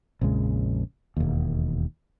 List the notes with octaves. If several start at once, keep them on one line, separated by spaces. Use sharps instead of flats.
A#1 F2 C#3 G#3
E1 D#2